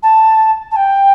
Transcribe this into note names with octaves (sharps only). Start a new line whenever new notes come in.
A5
A5
G5